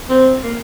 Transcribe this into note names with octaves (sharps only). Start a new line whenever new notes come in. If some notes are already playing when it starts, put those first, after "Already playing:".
C4
A#3